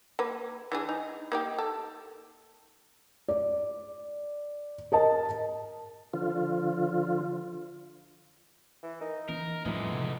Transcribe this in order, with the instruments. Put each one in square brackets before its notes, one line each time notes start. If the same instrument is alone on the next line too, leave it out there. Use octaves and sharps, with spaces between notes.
[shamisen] A#3 B4
E3 D4 G#4
D#4
A#3 D#4 G4
A4
[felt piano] D5
A#4 D#5 A5
[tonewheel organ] D3 F3 F4
[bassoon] E3
[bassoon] D#4 [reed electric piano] A#4
[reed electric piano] E3 [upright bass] C#4 [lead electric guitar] A#4
[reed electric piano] F2 A2 F3 [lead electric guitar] D3 G#3 [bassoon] E3 [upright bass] G3 D#4
[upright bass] C3